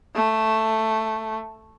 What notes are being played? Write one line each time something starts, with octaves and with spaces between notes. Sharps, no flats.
A3